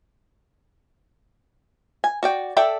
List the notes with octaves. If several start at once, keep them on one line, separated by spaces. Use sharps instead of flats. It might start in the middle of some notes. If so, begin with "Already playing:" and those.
G#5
F#4 D5 G5
A4 D5 E5 G5